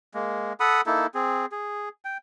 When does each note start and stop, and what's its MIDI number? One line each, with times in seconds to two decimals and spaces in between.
0.14 0.53 56
0.14 0.53 58
0.60 0.81 69
0.60 0.81 78
0.60 0.81 83
0.60 0.81 87
0.86 1.07 58
0.86 1.07 63
0.86 1.07 64
0.86 1.07 69
1.14 1.46 60
1.14 1.46 68
1.52 1.89 68
2.05 2.18 79